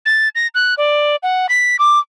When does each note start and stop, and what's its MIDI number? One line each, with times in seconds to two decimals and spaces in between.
0.06 0.29 93
0.35 0.47 94
0.55 0.74 90
0.78 1.16 74
1.23 1.47 78
1.49 1.76 95
1.79 1.99 86